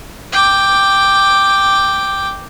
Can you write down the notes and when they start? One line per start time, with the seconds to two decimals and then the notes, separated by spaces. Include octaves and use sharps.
0.32 G5 D6